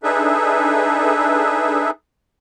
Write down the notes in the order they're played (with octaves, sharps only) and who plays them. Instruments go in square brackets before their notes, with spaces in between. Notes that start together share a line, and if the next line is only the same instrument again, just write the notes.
[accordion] D4 D#4 G#4 A4 B4 E5